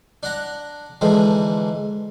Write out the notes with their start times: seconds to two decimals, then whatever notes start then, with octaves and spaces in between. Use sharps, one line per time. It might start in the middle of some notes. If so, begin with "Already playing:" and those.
0.23 D4 F#5 A#5
1.01 G#2 D3 E3 F3